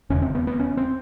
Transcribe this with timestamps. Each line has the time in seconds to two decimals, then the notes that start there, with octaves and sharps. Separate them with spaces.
0.10 E1 D#2 C#3 C#4
0.22 C4
0.35 B3
0.47 B3
0.60 C#4
0.77 C4